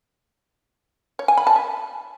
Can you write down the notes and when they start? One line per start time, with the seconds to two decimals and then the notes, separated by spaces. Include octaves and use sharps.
1.19 C#5
1.28 G#5
1.38 B5
1.47 A5
1.56 E5